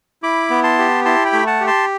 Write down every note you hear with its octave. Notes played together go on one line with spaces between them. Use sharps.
E4 B5 D6
B3
A5 C6
G4
E4 A5 C6
G5 B5
A3
F#5 A5
G4
A5 C6